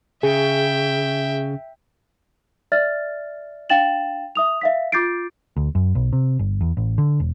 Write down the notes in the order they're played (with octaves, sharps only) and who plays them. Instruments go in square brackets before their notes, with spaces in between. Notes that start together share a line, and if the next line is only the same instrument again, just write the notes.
[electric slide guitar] C#3 [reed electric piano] G#4 [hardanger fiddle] E5 G5
[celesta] D5 E5 F6 A6
D4 F5 G5 A6 E7 F#7
E5 D#6 F7
E5 F5 B6
F4 D6 G6 A6 C7 D7
[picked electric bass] D2
F#2
B1
C3
G1
E2
A1
D3
E1